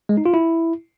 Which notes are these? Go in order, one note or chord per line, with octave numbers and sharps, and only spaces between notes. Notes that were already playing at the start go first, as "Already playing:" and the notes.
G#3
D#4
F4
E4